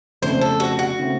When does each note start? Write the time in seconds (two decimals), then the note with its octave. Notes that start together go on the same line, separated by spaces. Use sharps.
0.22 F2 C#3 A3 C4 C5
0.41 A4
0.60 F#4
0.79 F#4
0.99 C#3 A3 C4